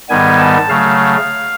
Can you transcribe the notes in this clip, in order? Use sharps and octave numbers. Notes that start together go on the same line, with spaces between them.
G#2 D#3 G3 B3 G#5
A5
C#3 F#3 A3 F5